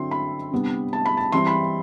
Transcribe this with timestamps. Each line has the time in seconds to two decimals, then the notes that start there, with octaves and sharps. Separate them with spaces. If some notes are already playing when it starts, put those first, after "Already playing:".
Already playing: D3 F#3 C4 E4 C6
0.11 B5
0.52 C3 G3 B3 D4
0.93 A5
1.06 B5
1.17 A5
1.32 E3 G3 C4 E4 C6
1.47 B5